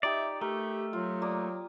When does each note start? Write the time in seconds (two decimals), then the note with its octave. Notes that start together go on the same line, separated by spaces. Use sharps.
0.03 D#4 G4 D5 E5
0.41 A3 G4 A#4
0.93 F#3 F4
1.22 A#3 D5 D#6